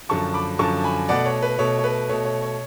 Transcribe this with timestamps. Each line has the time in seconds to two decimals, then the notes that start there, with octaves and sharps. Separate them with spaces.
0.09 F#2 D3 F3 A5 C#6
0.34 B5 D6
0.59 F#2 D3 F3 A5 C#6
0.84 G#5 B5
1.09 B2 A3 D5 F#5
1.26 C#5
1.43 B4
1.59 B2 A3 C#5
1.78 C#5
1.84 B4
2.09 B2 A3 C#5
2.25 C#5
2.42 C#5